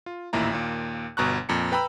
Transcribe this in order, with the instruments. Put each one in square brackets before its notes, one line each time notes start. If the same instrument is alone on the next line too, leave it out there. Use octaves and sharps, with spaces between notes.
[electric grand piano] F4
A1 D#2 A#2 E4 A#5
D#2 A#2 A#3
G1 B2 A#5 C#6 F#6
F2 A#2 A#5 C#7
B4 G5 A#5 B5 E6